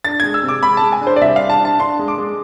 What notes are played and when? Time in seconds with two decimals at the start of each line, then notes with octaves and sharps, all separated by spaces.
0.05 D4 A6
0.20 G#3 G#6
0.34 E6
0.43 C3
0.48 D6
0.62 G#3 B5
0.77 G#3 A5
0.92 G#5
1.01 D4
1.07 C5
1.16 D5
1.21 C2 E5
1.36 D4 F5
1.49 A5
1.60 D4
1.65 A5
1.79 D4 C6
1.99 G#3
2.08 D6
2.18 G#3